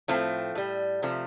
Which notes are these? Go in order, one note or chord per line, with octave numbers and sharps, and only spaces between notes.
A2 F3 A3 C4
A2 G3
C3 F3 A3